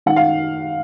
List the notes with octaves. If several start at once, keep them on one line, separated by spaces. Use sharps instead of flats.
D#3 F#5
F5